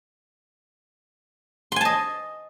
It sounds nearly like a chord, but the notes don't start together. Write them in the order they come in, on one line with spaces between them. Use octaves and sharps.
C6 G#5 A5 D#5